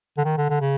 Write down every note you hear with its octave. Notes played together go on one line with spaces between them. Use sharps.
D3
D#3
D3
D3
C#3